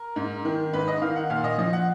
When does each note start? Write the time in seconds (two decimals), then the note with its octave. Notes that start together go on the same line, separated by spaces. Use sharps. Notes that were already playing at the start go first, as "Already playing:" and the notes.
Already playing: A#4
0.16 G#2
0.45 D#3
0.73 G#2 B4
0.88 D#5
1.02 D#3 F5
1.16 F#5
1.30 A#2 F5
1.44 D#5
1.58 F3 D#5
1.73 F#5